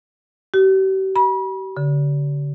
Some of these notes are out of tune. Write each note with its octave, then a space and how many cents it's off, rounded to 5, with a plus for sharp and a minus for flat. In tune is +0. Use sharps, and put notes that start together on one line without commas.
G4 -40
B5 -35
D3 -40